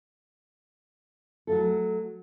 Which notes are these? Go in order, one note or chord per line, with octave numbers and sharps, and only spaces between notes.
F#3 A3 A4